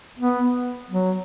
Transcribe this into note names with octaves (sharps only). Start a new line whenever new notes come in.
B3
F#3